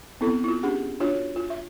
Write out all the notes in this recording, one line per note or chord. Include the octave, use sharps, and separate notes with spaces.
B3 C4 E4 A4
E4 F4
C#4 D4 G4 G#4 F#5
D4 F4 F#4 C#5
F4
E5